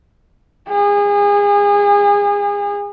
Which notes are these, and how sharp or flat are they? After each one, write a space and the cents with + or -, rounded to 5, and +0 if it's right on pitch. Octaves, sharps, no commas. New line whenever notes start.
G#4 -30